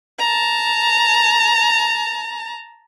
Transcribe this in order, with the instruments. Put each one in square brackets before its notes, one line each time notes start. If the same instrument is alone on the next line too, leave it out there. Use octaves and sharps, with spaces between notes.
[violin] A5 A#5